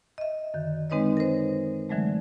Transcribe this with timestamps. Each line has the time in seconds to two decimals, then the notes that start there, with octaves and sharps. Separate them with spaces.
0.18 D#5 E5
0.54 F#2 D3 D#3
0.90 G#3 C4 D#4 B4 C#5 D#5
1.17 A#4 C5
1.89 D3 E3 F#3 G#3 A3